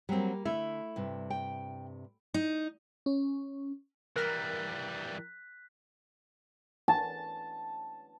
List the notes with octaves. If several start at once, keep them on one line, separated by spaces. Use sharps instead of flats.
F#3 G3 A#3 C4
D3 A3 E4
G2 C3
G5
D#4
C#4
E3 G3 A#4 F#6 B6
A5